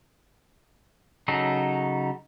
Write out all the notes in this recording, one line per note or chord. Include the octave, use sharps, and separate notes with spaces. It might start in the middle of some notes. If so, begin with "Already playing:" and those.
C#3 F#3 D#4 A4